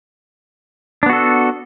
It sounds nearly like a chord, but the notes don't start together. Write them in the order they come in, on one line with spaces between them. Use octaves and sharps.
D4 B3 F#4 A4